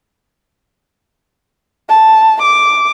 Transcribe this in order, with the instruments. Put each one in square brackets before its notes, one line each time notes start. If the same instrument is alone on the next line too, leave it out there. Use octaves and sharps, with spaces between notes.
[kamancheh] A5
D6